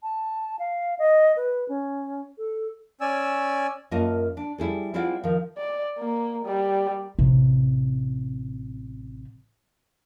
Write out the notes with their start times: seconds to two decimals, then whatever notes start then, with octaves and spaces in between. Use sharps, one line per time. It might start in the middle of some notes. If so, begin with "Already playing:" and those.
0.03 A5
0.59 F5
0.99 D#5
1.37 B4
1.69 C#4
2.38 A4
3.01 C#4 D5 G#5 E6
3.91 F#2 A#3 F4 A#4 D#5 A5
4.37 D4
4.58 G3 E4 G#4 A4
4.94 C4 E4 F4 G#4 D5 F#5
5.24 D#3 F3
5.57 D5
5.99 A#3
6.45 G3
7.19 A1 C3